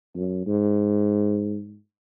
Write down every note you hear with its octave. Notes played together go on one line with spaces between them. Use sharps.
F#2
G#2